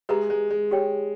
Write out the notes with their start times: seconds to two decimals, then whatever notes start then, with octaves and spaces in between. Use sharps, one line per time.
0.09 G#3 G4 B4 E5 A#5
0.30 G#3
0.50 G#3
0.71 G4 C#5 G5